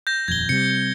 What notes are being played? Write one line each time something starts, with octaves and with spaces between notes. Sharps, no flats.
G6 A#6
D#1 F2 G#6 G7
C3 G3 C#7